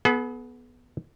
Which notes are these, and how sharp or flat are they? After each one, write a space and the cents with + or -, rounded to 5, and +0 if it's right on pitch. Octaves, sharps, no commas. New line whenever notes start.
B3 -5 G#4 +45